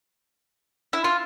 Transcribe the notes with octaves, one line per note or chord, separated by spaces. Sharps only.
E4
F4